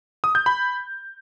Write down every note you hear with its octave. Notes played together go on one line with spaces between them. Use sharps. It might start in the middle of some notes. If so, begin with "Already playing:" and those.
D#6
G6
B5